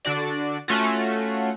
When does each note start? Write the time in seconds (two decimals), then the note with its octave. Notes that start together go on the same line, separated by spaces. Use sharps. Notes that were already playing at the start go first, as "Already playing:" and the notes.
0.05 D3 D4 F#4 D5
0.68 A3 C#4 F4 F#4